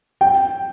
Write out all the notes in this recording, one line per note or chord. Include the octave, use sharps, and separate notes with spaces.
G5